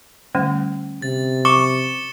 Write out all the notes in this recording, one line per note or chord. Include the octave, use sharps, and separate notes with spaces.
D3 G3 A3 C#4
C3 A6
C#6 D6 C#7 E7 G7